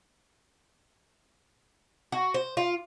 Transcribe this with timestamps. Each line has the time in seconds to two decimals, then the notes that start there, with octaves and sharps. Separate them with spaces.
2.12 F#4
2.34 C5
2.57 F4